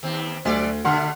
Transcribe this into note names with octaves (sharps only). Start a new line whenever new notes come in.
D#2 C4
D2 B2 F#3 D5
B2 D3 A3 F#5 C6 F6